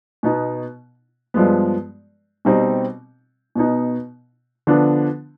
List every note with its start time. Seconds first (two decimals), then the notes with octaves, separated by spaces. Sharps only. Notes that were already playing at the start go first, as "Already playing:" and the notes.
0.23 B2 B3 D#4
1.34 G2 F3 G#3 B3
2.45 B2 G3 C4 D#4
3.55 B2 B3 D#4
4.67 D3 F3 B3 D4